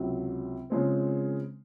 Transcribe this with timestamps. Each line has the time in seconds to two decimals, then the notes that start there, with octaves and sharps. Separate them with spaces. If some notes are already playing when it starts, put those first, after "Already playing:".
Already playing: C#2 C3 F#3
0.70 C#3 F3 G#3 C4